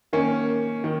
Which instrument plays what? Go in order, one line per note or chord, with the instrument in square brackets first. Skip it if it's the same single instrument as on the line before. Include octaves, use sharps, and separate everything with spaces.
[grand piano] D#3 A#3 C#4
D#3